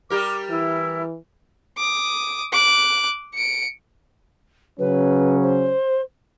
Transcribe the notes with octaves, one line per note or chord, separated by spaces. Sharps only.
G3 G4 A#4 D6
E3 E4
D6 D#6
D6 F#6
C#7 D7
C#3 F#3 C#4 B4
C5